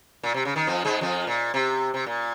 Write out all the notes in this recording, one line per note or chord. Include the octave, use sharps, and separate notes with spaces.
A#2
C3
C#3
D#3
F2 F3
G#2 G#3
F2 F3
A#2
C3
C3
A#2